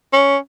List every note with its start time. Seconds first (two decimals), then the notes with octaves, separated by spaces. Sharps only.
0.13 C#4